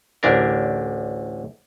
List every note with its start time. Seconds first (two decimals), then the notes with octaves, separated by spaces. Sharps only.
0.23 A1 D2 D4 A#4